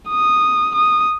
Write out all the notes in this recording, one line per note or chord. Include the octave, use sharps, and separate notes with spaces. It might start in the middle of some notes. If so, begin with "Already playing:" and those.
D#6
D#6